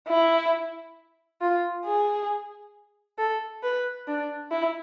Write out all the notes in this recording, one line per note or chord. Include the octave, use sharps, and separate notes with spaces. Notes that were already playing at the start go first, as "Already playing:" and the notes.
E4
F4
G#4
A4
B4
D4
E4